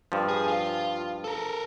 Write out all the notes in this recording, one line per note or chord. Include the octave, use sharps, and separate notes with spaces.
G2 F3
G#4
F4
A4 A#4